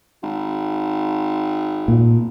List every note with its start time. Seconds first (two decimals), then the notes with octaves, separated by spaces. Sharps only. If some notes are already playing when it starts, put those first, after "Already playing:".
0.23 G#1
1.88 A#2